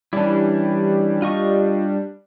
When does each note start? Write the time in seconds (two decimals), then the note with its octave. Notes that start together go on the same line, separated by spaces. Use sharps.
0.13 E3 G3 C#4 D4 E4
1.22 F4 D#5 C#6